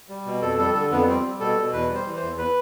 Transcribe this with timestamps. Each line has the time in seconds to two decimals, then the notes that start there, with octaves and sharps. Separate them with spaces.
0.09 G3
0.25 B2
0.42 F2 A4
0.58 G3 A4
0.74 D3 A4
0.91 F2 B3
1.07 G3 C4
1.24 G3
1.40 B2 A4
1.57 B2
1.73 E2 B4
1.89 G3
1.94 C5
2.06 E3
2.16 C5
2.22 E2
2.38 B4